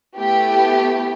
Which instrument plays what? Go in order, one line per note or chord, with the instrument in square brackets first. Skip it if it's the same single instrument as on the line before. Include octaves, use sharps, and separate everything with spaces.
[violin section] A3 B3 E4 G4